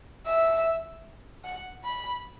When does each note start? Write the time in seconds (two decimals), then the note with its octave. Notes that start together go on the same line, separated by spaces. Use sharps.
0.26 E5
1.44 F#5
1.84 B5